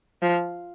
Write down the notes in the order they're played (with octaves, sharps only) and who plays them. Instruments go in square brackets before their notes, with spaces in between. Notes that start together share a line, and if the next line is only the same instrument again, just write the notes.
[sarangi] F3